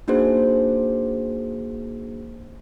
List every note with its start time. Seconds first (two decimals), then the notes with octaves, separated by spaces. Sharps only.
0.08 A#3 D4 D#4 F#4 G#4 C5